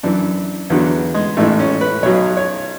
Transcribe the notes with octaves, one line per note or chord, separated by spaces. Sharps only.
F#2 E3 D4
E2 D3 F#3 B3
G#3
A1 G#2 E3 A3
C#4
B4
B1 B2 F#3 C#5
C#5